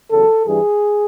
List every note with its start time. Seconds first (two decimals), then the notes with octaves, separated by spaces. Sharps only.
0.11 E2 C#3 F#3 A4
0.47 G2 E3 G3 G#4